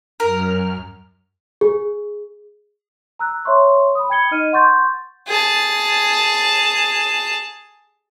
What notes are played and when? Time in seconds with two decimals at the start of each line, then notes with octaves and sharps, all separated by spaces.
0.20 F#2 A#4 F6
1.61 G#4
3.19 A#5 E6 F#6
3.45 C#5 E5 C6 C#6
3.95 B5 D#6
4.10 G5 B5 G#6 C#7 G7
4.31 D#4 D#5 F6 D#7
4.53 F#5 C6 C#6 G6 A6
5.28 G#4 A5